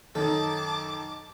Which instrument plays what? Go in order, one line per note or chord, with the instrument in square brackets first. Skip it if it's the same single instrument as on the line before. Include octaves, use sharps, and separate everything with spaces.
[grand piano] F#2 D#4 [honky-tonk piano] D#3 [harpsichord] A4 [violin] A5 D6